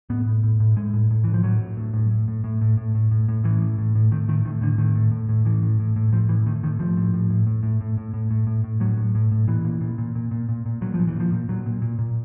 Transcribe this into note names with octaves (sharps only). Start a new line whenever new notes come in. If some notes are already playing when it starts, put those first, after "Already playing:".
A2 B3
A2
A2
A2
A2 G#3
A2
A2
A2 E3
F3
A2 F#3
A2
A2
A2
A2
A2
A2
A2
A2
A2
A2
A2
A2 E3
A2
A2
A2
A2 D#3
A2 D#3
A2 D#3
A2 D3
A2 D#3
A2
A2
A2
A2 E3
A2
A2
A2
A2 F3
A2 E3
A2 D#3
A2 D#3
A2 F3
A2
A2
A2
A2
A2
A2
A2
A2
A2
A2
A2
A2 F#3
A2
A2
A2
A#2 E3
A#2
A#2
A#2
A#2
A#2
A#2
A#2
A#2 F#3
F3
A#2
E3
A#2 F3
A#2
A#2 F#3
A#2
A#2
A#2